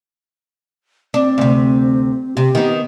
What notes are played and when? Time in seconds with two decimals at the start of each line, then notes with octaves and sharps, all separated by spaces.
1.14 C4 D4
1.38 D2 C3
2.37 C3 G4
2.55 D#3 B3